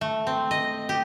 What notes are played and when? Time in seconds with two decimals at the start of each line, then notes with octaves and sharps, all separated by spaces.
0.01 A3
0.27 C4
0.51 D#5
0.89 G4